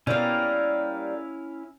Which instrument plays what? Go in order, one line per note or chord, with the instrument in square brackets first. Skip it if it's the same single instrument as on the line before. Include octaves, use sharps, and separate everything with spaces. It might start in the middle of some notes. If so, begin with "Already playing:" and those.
[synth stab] B2 B3 [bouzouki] G3 A#3 [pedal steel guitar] C#4 E4 F5